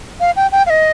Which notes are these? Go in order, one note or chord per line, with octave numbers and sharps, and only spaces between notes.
F5
G5
G5
F5
D#5